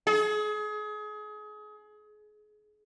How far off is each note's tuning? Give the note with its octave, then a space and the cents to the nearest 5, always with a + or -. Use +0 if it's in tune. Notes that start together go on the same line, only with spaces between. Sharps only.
G#4 +30